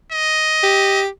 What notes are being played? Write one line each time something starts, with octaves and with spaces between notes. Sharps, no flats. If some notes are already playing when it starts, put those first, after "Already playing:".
D#5
G4